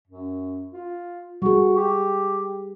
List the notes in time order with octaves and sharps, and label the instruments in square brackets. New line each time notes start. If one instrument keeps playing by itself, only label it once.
[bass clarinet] F#2
F4
[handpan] G3 G#4 [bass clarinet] F#4
[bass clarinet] G4